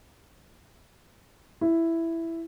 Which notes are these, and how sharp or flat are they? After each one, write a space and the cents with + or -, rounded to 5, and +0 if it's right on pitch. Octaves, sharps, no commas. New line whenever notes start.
E4 +5